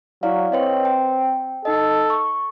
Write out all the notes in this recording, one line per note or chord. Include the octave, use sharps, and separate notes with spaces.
F#3 E4 D5 F5
C4 B4 C#5 D#5
G5
D#4 A4 D#5
C#6